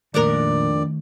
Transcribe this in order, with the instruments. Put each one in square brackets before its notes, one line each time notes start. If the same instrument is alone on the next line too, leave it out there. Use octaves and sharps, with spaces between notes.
[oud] F2 D4 A#4 [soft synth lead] A#2 [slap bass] D#3 A3 [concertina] D5